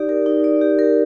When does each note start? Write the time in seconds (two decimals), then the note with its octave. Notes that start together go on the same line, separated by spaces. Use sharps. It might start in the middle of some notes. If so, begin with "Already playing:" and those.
Already playing: D#4 G4 D5
0.09 A#4
0.26 D#4
0.44 D5
0.61 G4
0.79 A#4